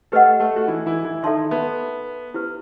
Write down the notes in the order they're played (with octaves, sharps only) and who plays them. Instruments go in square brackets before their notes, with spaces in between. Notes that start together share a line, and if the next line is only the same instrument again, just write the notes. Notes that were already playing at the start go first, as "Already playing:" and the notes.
[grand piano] A3 A4 [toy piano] G4 B4 D#5 F#5
[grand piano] A3 A4
F#4
E3 E4
E3 E4
E3 E4
[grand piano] D#3 D#4 [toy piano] A4 E5 A5 C6
[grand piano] B3
[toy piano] E4 G4 B4